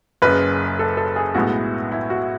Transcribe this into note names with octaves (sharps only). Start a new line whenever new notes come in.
F#1 F#2 C#3 B4
A4
A4
G#4
B1 A2 G#3 B3 F#4
E4
F#4